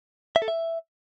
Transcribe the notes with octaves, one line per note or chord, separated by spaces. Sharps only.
E5
A4
E5